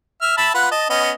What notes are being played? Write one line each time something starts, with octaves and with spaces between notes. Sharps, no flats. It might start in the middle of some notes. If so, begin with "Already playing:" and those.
E5 F6
E5 A5 B5
F4 B4 F#5
D#5 A5
B3 C#4 D#5